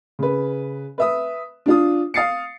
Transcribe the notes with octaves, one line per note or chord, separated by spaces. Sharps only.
C#3 B4
B4 E5 D#6
D4 F4 D#6
F5 D#6 A6 C7 C#7